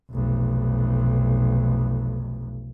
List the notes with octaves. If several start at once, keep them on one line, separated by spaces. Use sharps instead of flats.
F1 B1